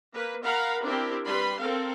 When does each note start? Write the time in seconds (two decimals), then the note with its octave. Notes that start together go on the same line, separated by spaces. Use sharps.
0.13 A#3 B4
0.44 A#4 F5 F#5 A#5 B5
0.84 C4 D4 E4 G4 A#4
1.26 G3 B4 B5 C6
1.58 C4 A4 A#4 F5